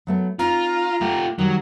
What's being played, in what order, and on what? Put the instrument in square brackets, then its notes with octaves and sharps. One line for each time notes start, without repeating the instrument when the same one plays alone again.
[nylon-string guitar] F#3 A3 B3
[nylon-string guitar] C4 D#4 [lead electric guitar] F4 [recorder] A#5
[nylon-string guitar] A3 [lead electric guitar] F4 G4
[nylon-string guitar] D#3 G3 D5 [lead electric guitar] F#3